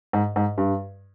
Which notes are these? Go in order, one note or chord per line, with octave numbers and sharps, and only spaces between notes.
G#2
G#2
G2